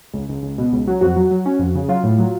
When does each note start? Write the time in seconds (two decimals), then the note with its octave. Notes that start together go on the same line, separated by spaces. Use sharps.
0.14 C#2
0.29 C#2
0.43 C#2
0.58 B2
0.73 C#2
0.87 F#3
1.01 F2 F#4
1.16 F#3
1.31 F#3
1.46 C#4
1.59 F2
1.75 C#3
1.89 F#3 F4
2.04 A2
2.19 F#3